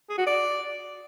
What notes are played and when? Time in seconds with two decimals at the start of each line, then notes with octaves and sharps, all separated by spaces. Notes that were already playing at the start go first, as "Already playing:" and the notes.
0.09 G#4
0.18 F#4
0.26 D5